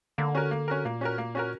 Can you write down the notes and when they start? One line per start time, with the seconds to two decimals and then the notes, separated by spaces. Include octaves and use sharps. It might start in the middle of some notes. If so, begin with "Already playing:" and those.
0.18 D3 A#3
0.35 C#4 F#4 A#4
0.51 A#3
0.68 C#4 F#4 A#4
0.85 A#2 A#3
1.01 C#4 F#4 A#4
1.18 A#3
1.35 C#4 F#4 A#4